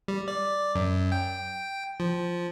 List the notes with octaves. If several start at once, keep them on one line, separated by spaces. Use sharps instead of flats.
G3
D5
F#2
G5
F3